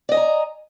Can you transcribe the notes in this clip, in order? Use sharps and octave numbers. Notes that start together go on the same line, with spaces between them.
D5 D#5 G#5 A#5